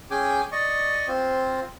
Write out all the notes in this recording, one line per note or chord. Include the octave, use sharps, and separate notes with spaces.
C#4 G#4 G5 G#5 D6
D5 D#5 C#6
C4 F4 C5